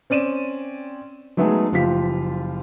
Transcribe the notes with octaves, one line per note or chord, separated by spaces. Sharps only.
C4 C#4 D5 D#7 E7
F#3 G#3 A3 B3 D#4 G#4
F#1 F3 F4 G4 B6